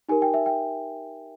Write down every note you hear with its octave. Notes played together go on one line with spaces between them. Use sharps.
D#4 G4 A#4 G#5
G5
E5
G5